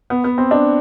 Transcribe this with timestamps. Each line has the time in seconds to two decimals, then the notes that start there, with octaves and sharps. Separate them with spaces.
0.10 B3
0.24 B3
0.38 C4
0.51 D4